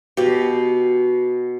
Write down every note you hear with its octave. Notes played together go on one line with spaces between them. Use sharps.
B2 G4